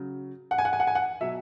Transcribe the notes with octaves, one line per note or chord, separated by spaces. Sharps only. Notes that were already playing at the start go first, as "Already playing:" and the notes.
Already playing: C#3 F#3
F#5
G#5
F#5
G#5
F#5
G#5
F#5
B2 F#3 E5